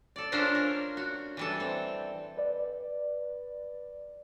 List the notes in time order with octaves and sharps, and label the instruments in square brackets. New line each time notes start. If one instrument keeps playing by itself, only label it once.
[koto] A4 D5
C#4 D4 F4 A4 A#4 C5
A#4
F#4
E3 G3 A4
C4
[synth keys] B4 D5